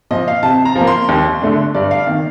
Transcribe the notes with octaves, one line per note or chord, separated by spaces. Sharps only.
A#2 F3 D#5
F5
C3 A5
A#5
F3
A#3
C6
D#2
D3 A3 D4
G2 D5
F5
D#3 A#3